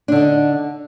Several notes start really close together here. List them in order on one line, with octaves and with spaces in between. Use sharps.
D4 D3 D#4